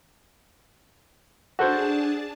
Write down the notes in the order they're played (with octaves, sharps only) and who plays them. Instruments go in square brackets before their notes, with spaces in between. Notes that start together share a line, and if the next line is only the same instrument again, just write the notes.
[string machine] D4 G#4 A5 [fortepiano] F#4 A4 C5